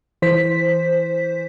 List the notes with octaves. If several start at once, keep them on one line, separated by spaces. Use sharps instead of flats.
E3 C5 B6